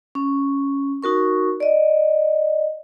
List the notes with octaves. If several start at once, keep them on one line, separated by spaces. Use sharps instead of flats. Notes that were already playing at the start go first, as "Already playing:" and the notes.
C#4
D#4 F#4 A#4 C#6
D5 D#5